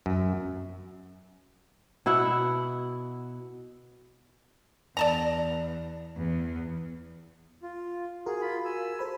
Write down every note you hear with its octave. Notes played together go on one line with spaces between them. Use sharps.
F#2
B2 E4 E5 F#5
E2 D5 A5 A#5
E2
F4
F#4 G#4 A#4
F4 B5
G#5 E6
A4 C5 B5